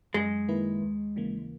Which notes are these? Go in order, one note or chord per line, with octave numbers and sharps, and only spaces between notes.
F#2 G#3
D#3 A#3 E4 B4
D#2
C#3 E3 A#3